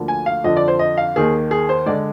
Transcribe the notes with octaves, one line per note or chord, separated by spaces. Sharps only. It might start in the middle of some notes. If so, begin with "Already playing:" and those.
Already playing: D2 D3 F3 A#3
G#5
F5
F2 D3 F3 D#5
D5
C5
D#5
F5
D#2 D#3 A#3 G#4
G#4
C5
D3 G#3 D5